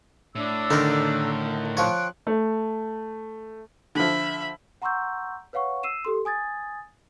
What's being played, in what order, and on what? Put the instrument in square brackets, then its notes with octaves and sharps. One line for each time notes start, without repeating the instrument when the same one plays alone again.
[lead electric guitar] A2 [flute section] D4 E6
[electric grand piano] D3 D#3 [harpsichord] D#4 A#4
[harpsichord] F3 C#5 [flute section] G5 F#6
[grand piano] A3
[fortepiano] D3 F3 [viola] E5 B5
[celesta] F#5 A#5 C6 C#6 E6 G6
B4 C#5 F5 F#5 C#6
E6 C7 D#7 E7
G4 A4 C6
G#5 D#6 G#6 A6